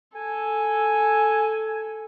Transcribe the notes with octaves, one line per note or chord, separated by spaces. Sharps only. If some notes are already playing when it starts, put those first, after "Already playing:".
A4 G#5